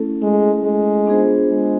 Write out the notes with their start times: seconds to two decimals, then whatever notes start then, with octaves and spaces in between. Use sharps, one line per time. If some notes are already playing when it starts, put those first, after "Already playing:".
Already playing: A3 C#4 E4 A4
0.22 G#3
0.65 G#3
1.07 B3 D4 F4 G#4 C5
1.49 G#3